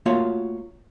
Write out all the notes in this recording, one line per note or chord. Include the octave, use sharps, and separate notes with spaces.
A3 A#3 F4 F#4 C#5 F5